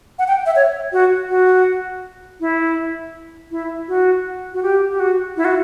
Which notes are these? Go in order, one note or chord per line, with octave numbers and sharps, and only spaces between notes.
F#5
G5
E5
C#5
F#4
F#4
E4
E4
F#4
F#4
G4
G4
F#4
E4
F#4